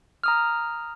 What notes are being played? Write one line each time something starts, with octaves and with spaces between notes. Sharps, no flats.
A#5 D#6 F6